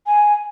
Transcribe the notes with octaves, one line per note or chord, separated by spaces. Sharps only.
G#5